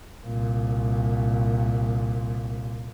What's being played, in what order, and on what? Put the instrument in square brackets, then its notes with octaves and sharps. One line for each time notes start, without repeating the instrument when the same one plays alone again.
[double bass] C2 A#2